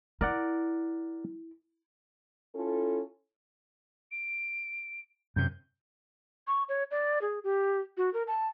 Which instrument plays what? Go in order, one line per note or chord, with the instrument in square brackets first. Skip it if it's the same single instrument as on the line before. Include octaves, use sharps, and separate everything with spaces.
[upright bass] E4 [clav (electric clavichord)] A#4 D5 F#5
[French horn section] C#4 E4 F4 A4
[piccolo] D7
[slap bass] F#2 C3 [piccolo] G6
[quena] C#6
C#5
D5
G#4
G4
F#4
A#4
A5